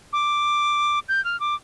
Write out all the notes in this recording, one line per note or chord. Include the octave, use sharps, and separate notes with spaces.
D6
G6
F6
D6